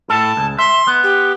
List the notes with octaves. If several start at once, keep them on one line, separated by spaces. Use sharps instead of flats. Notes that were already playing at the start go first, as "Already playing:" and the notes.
A2 A4 A5
C#2
E5 C6
B3
G4